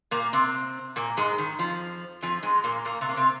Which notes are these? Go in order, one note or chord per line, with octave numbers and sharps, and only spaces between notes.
A#2 A#3
C3 C4
A#2 A#3
G#2 G#3
D#3
F2 F3
F2 F3
G#2 G#3
A#2 A#3
A#2 A#3
C3 C4
A#3
C3 C4